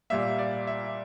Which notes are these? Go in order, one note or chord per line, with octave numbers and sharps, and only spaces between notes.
A#2 G3 A#3 E5
D5
E5